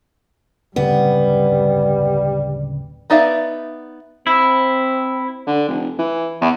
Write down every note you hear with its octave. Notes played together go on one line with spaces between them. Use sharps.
D1 G2 C#3 G3 B3 C4
B3 D#4 D5 E5 F5
C4 E4
D3
F1
E3
E2